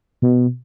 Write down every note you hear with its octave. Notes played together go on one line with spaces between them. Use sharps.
B2